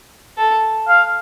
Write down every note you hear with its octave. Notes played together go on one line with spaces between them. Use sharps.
A4
F5